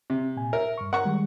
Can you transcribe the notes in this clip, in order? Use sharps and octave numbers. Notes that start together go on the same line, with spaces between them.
C3
A#2 G#5
A#4 E5
G2 C#6
A#4 F#5 A#5 C#6
D#3 G3 G#3